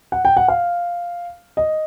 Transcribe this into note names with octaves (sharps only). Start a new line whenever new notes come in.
F#5
G5
F#5
F5
D#5